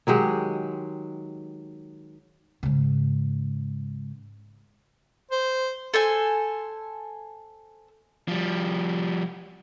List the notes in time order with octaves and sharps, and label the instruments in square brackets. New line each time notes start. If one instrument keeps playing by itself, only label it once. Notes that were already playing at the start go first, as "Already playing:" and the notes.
[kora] D#3 F#3 G#3 G4
[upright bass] G#2 C#3
[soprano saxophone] C5
[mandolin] A4 C5 G#5
[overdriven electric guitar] F3 G3